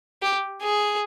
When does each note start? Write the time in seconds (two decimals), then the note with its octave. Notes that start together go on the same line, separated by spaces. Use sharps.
0.22 G4
0.62 G#4